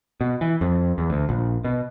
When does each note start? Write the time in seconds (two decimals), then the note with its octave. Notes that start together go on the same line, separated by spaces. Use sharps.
0.21 B2
0.41 E3
0.61 F2
0.98 E2
1.10 D2
1.29 A#1
1.64 B2